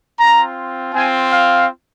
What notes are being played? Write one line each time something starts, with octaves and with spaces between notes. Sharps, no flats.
C4 F4 A#5
C4 F4 G#5
F5